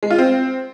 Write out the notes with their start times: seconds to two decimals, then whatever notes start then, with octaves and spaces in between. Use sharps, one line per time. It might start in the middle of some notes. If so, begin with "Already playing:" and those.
0.03 G#3
0.10 F4
0.18 C4